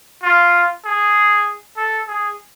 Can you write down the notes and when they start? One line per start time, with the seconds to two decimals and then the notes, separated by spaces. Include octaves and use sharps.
0.23 F4
0.85 G#4
1.77 A4
2.08 G#4